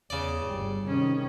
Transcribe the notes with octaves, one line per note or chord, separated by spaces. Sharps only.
E2 C#3 D5
G1 G3
C3 D#3 C#4